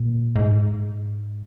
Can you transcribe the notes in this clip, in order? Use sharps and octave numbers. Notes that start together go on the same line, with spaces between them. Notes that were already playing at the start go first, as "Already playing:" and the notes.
Already playing: A#2
G#2